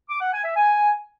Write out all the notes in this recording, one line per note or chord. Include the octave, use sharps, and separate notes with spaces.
D6
F#5
G#5
E5
G#5